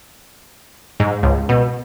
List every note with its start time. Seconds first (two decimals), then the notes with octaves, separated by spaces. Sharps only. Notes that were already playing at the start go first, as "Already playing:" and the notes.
1.00 G#2
1.23 C#2
1.49 B2